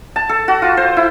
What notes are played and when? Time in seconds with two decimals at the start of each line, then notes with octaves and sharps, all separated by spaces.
0.16 A5
0.29 A4
0.48 F#4
0.62 F4
0.77 C5
0.97 E4